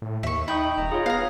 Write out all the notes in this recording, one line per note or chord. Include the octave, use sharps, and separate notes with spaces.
A2
D#2 E5 C#6
D#4 E5 G5 B5 D#6 G6
D#1 D#5 A#5
F4 G#4 C#5
B3 F5 A#5